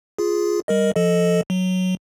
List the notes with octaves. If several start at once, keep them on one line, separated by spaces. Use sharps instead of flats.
F4 G#4
G3 A#4 D#5
F3 A4 D#5
F#3